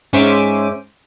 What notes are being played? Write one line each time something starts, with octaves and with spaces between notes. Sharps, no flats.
G#2 C#4 C5 E5 D6 D#7